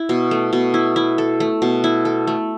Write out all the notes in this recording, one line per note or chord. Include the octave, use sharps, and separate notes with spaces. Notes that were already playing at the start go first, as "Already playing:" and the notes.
Already playing: E4
B2
A3
B2
E4
E4
A4
A3
B2
E4
A4
A3